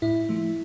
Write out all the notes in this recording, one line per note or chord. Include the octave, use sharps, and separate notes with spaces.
A2 E4
F3 A3